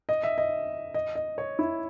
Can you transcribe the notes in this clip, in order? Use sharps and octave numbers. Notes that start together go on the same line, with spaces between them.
D#5
E5
D#5
D#5
D#5
C#5
E4